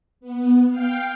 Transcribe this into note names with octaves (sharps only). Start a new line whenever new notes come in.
B3
F5 G5